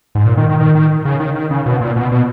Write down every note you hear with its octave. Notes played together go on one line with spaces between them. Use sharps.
G#2
A#2
D#3
D#3
D#3
D#3
C#3
D#3
D#3
C#3
B2
A#2
B2
B2